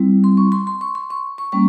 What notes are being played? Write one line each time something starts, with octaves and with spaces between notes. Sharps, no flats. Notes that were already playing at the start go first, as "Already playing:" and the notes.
Already playing: G3 C4 E4
C6
C#6
C6
C6
C#6
C6
C#6
C#6
G3 A#3 C#4 C#6